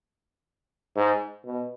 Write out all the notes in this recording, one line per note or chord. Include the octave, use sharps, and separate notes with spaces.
G#2
B2